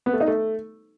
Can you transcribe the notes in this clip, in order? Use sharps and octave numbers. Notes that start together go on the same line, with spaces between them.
B3
A3
D#4
A3